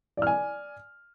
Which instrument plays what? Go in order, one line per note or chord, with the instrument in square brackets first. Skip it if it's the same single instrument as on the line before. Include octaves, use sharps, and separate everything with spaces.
[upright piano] D5
F6
G#5